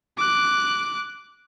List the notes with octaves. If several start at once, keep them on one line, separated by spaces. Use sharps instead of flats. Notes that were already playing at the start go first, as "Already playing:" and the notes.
D6 F#6